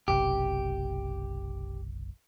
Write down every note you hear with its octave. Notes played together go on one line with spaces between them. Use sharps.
F#1 B1 C3 G4